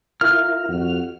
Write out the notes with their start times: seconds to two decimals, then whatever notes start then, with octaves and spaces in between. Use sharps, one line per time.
0.21 E4 F4 A#4 F6
0.69 F2 F#4